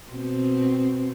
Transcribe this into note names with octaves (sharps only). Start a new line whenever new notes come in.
B2 C4